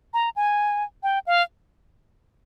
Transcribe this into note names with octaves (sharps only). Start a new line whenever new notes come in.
A#5
G#5
G5
F5